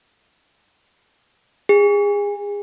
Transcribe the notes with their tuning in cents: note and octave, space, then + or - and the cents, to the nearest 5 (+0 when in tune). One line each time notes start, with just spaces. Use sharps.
G#4 -30